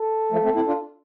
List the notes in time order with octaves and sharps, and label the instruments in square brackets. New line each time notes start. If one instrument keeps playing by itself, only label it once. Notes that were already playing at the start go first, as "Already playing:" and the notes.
Already playing: [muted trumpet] A4
[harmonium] F3 A3
A3 C4
C4 E4
D4 F4